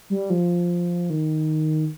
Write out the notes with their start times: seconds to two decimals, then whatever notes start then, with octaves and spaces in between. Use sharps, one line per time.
0.10 G3
0.30 F3
1.10 D#3